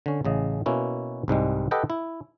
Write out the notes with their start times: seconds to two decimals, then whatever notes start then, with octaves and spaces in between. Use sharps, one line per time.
0.06 D3 C#4
0.25 A1 C#3 D#5
0.66 B2 A#3 C#4 E4
1.28 C2 G#2 G3 G#3
1.71 G4 A4 B4 D#5 F#5 G5
1.90 E4